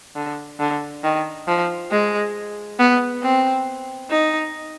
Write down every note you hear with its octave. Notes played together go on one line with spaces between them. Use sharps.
D3
D3
D#3
F3
G#3
B3
C4
D#4